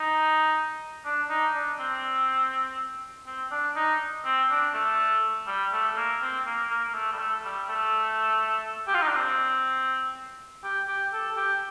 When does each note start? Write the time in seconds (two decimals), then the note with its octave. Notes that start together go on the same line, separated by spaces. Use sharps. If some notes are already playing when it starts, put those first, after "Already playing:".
Already playing: D#4
1.05 D4
1.30 D#4
1.55 D4
1.79 C4
3.26 C4
3.51 D4
3.75 D#4
4.25 C4
4.50 D4
4.73 A3
5.47 G3
5.72 A3
5.96 A#3
6.21 C4
6.46 A#3
6.70 A#3
6.84 A#3
6.94 A3
7.13 G3
7.19 A3
7.44 G3
7.68 A3
8.87 G4
8.94 F4
9.01 D#4
9.08 D4
9.15 C4
10.63 G4
10.88 G4
11.13 A4
11.36 G4